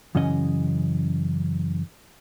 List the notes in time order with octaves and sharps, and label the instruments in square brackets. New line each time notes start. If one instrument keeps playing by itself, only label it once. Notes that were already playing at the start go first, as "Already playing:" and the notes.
[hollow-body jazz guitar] F#2 C#3 E3 C#4 D#5